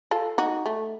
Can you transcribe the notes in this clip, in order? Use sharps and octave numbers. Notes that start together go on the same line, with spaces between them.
F4 A4
D#4 F#4
A3